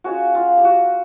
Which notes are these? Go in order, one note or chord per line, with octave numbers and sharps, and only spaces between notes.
G#3 C#4 F4 F#4
F4
G4
F#4